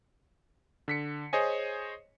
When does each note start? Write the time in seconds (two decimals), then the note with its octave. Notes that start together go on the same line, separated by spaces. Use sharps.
0.88 D3 B6 C#7
1.33 G#4 C5 C#5 D#5 G#5